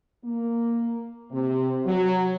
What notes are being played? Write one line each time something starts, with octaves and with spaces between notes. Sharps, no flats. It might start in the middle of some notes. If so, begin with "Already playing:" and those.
A#3
C3
F#3